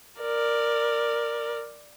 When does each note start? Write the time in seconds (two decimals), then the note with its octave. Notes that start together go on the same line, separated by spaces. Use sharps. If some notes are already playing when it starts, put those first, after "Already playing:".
0.20 A#4 D5